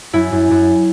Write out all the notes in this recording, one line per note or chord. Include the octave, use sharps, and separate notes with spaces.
F#2 E4
F#2
F#2